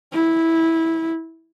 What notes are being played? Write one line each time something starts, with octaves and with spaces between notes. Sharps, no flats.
E4